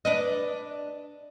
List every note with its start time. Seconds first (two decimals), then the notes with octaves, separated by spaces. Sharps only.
0.05 D4 B4 D#5